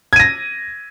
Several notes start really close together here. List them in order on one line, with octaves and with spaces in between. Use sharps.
G#6 D#7 A#6